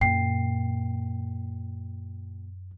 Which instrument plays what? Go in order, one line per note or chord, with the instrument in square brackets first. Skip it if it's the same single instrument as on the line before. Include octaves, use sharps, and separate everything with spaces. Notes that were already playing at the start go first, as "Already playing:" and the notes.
[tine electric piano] F#2 [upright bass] A#2 [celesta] G5 C7